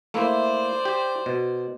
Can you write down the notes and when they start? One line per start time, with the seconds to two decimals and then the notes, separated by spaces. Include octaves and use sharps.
0.14 A3 A#3 E4 C5 D5
0.85 G4
1.26 B2